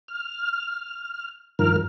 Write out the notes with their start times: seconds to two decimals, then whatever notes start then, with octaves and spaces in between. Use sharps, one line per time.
0.08 F6
1.59 G2 D#3 F3 A#4 F6